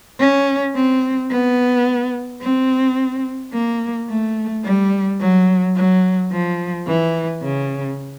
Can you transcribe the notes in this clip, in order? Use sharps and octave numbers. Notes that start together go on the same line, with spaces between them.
C#4
C4
B3
C4
A#3
A3
G3
F#3
F#3
F3
E3
C#3